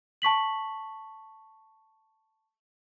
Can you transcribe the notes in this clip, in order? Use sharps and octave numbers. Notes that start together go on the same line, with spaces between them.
A5 C#6 B6 F#7